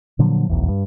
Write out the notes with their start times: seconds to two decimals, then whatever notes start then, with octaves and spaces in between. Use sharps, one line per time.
0.19 A#2 D3 F3 F#3
0.49 F1 B1 E2
0.68 G2